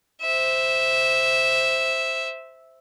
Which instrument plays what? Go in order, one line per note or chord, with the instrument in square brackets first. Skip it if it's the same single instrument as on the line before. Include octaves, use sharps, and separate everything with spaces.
[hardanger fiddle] C5 E5